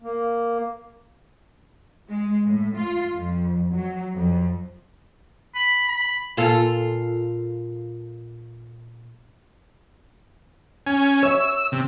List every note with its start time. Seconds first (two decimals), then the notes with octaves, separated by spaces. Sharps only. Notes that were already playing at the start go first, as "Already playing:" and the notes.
0.02 A#3
2.10 G#3
2.45 A2
2.76 F4
3.12 F2
3.71 F#3
4.14 F2
5.55 B5
5.88 B5
6.37 A#2 F4 A4
10.86 C#4 G#5
11.23 C#5 E5 E6
11.72 C3